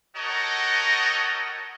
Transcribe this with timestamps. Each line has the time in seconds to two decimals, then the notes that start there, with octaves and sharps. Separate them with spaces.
0.16 F#4 G4 A4 A#4 C#5 D#5